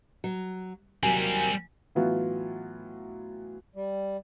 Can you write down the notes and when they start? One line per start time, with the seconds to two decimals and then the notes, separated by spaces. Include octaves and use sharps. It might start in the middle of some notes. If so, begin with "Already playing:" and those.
0.24 F#3
1.03 D#2 F#3 G3 A#3 C4 G#5
1.95 A2 E3 F#3 B3 F4
3.76 G3